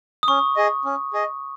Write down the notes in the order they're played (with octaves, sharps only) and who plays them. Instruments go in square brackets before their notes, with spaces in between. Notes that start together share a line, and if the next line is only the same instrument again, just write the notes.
[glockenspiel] D#6
[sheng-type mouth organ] C#4 [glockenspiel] C#6
[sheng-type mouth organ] G#4 D#5
C#4
G#4 D#5